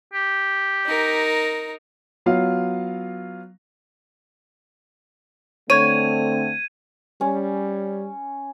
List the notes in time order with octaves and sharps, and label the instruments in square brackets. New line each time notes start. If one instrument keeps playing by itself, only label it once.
[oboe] G4
[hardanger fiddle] D#4 A#4
[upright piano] F#3 B3 F4 F5
[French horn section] D3 A3 C4 [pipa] C#5 [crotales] G#6 D#7
[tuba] G3 [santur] C#4